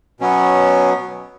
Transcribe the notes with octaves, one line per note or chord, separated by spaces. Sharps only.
B2 F#3 B3 C#4